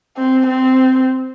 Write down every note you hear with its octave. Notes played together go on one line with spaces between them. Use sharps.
C4
C4